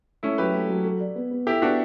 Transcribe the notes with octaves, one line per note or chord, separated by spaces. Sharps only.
A3 C#4 E4
F#3 G4 B4
A3
F#3
A4
D5
B3
B3
E4 G4 A4
B3 D4 F#4